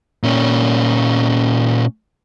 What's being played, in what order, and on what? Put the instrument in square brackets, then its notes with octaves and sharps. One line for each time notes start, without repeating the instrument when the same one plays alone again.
[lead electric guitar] A#2 C#4